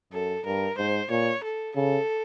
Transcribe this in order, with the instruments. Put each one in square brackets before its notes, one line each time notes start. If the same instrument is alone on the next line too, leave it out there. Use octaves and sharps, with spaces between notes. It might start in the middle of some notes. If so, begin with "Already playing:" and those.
[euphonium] F#2 [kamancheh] A4
[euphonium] G2 [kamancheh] A#4
[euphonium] G#2 [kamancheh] C5
[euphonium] A#2 [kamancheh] C#5
[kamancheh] A4
[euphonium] C#3 [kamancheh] A4